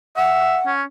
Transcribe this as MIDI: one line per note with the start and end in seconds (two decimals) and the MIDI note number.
0.17 0.59 76
0.17 0.71 78
0.66 0.83 61